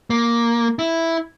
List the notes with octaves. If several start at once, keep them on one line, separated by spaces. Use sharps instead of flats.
A#3
E4